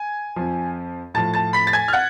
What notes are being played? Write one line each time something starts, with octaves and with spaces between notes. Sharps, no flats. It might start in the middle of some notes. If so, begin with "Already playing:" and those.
Already playing: G#5
F2 F3
A2 F3 A5 A6
A5 A6
B5 B6
A6
G#5 G#6
F6
F#5 F#6